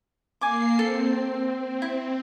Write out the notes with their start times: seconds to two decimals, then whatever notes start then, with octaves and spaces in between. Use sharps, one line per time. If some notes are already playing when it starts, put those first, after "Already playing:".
0.41 A#3 G#5 D6 C7
0.79 C4 A4
1.82 E4